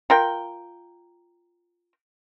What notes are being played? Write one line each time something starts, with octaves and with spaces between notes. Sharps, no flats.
F4 A#4 G5